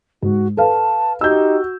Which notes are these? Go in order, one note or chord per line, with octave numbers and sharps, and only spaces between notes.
G#2 F#4
A4 B4 F5 A5
D#4 F#4 G4 E6 G6